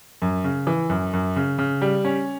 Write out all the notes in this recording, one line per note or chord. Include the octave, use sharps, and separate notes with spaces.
F#2
C#3
E3
F#2
F#2
C#3
C#3
G3
C#4